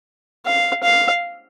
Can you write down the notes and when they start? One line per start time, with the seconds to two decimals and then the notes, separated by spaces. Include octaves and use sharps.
0.46 F5
0.83 F5